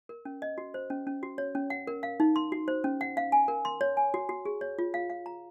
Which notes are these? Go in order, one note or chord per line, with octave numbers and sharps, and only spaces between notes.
A#4
C#4
D#5
F#4
C5
C#4
C#4
F#4
C#5
C#4
F#5
A#4
F5
D#4
C6
F#4
C5
C#4
F#5
F5
G#5
A#4
C6
C#5
G#5
F#4
F#4
G#4
C#5
F4
F5
F5
A#5